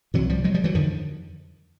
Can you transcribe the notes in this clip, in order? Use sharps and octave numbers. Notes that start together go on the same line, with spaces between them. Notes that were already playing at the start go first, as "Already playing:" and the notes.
C2 C3 E3 F#3
F3 G3
F#3 G#3
F3 G3
E3 F#3
F2 D3 D#3 F3